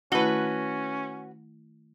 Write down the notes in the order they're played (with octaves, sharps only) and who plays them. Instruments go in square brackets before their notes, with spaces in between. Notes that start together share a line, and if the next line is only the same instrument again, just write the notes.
[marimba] D#3 A3 E4 [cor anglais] C#4 [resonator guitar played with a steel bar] F#4 B4